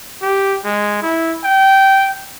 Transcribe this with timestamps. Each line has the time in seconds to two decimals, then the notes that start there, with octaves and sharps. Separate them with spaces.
0.22 G4
0.65 G#3
1.02 E4
1.44 G5